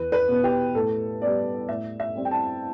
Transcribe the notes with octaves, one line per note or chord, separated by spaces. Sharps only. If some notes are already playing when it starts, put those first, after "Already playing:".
Already playing: E2 B4
B4
B2 B3
G4
A2 A4
G3 B3 D5
A2 E5
E5
G3 C4
G5
A5